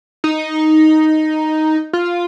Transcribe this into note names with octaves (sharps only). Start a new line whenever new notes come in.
D#4
F4